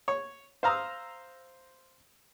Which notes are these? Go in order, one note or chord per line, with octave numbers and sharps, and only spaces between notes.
C#5
C5 F5 A#5 D#6 E6